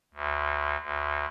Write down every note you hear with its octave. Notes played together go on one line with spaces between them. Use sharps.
D2
D2